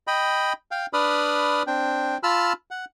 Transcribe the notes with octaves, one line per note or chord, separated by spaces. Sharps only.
D#5 G5 B5
F5 G5
D4 B4 D5 B5 D#6 F6
C4 D4 G5
F4 A5 B5 E6 F6
F#5